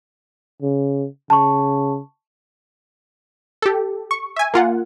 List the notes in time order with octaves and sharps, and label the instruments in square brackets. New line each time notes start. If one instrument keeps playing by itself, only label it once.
[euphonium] C#3
[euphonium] C#3 [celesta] A5 C#6
[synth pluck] G4 A4
C#6
E5 G#5
A#3 F4 F#5